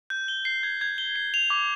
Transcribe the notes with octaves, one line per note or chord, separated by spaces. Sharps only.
G6
G7
C7
G#6
G#6
G7
C7
F7
D6